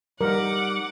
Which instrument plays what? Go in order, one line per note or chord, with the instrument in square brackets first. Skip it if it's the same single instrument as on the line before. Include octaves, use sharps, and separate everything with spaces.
[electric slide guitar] G3 D#4 [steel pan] A#4 [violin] F#5 D6